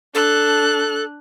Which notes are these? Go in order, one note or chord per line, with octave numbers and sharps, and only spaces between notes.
D4 A4 F#6